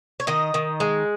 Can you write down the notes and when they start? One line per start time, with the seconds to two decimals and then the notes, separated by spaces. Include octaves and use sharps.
0.20 C#5
0.27 D#3 D#5
0.54 D#3
0.80 G#3